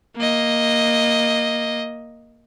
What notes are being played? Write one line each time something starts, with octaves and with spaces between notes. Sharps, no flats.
A#3 D#5